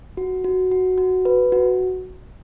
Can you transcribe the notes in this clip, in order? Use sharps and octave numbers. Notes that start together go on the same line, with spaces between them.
F#4
F#4
F#4
F#4
B4
F#4